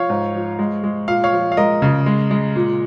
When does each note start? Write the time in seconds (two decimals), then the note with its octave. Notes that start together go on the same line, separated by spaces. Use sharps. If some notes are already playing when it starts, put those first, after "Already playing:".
Already playing: F3 C#5 F5
0.10 G#2
0.34 F3
0.59 G#3
0.83 G#3
1.08 A#2 F5
1.24 C#5 F5
1.33 F3
1.52 F5
1.57 G#3 A#4 D#5
1.82 C#3
2.06 G#3
2.31 G#3
2.56 A#2